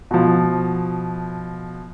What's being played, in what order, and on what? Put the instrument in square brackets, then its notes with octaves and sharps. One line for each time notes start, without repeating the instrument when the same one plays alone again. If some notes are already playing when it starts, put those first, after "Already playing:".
[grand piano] B2 F3